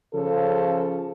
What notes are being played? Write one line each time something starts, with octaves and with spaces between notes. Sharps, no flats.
C#3 F3 A4